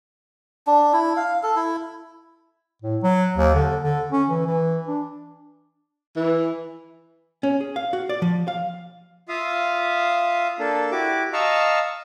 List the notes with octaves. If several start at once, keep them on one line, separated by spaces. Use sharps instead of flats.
D4
E4
F5
A4
E4
A2
F#3
D#2
D3
D3
C#4
E3
E3
D4
E3
C#4
G#4
F5
F#4
D5
F3
F5
F4 E5 F5 D#6
A#3 D4 A4
E4 F#4 G4 D6
D#5 F5 A5 A#5 C#6 E6